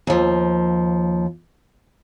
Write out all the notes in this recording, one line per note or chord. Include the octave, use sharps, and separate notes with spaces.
D#2 F3